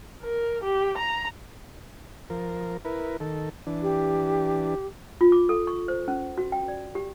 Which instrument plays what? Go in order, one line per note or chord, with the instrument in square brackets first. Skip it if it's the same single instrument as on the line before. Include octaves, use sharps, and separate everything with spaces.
[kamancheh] A#4
G4
A#5
[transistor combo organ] F3 A#4
E4 A#4 B4
D#3 A4
E3 D4
[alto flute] G4
[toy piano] F4
D6
A4
C#6
C5
C#4
F#4
G5
D5
G4